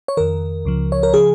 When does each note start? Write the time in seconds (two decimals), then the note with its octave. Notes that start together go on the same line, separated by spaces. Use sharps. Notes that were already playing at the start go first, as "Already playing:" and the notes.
0.08 C#5
0.17 F2 D#3 A#4
0.65 C#2 C#3 F3
0.92 C#5
1.03 A#4
1.14 C#3 F3 G#4